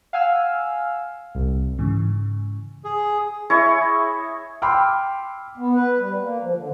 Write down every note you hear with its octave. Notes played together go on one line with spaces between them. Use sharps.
F5 F#5 G#5 E6 F6
C2
G#2 C#3 E3
G#4
E4 G#4 C#5 D#5
G5 B5 C6 D6 E6 F6
B3
B4
G3
A#3
F3
D3